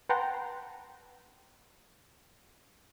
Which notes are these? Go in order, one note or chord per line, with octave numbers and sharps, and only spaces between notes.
B4 F#5 G5 A5 A#5 C6